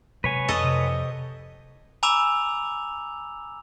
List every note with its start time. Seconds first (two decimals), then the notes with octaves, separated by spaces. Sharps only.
0.24 C3 F#3 G#3 B4 C#5 G#5
0.49 F2 A4 D#5
0.63 C3
0.84 G5
2.03 G#5 A#5 B5 D6 E6 F7